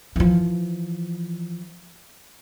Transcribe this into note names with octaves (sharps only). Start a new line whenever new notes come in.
E3 F3